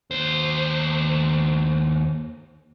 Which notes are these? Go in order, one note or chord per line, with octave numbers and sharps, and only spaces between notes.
D#2 C5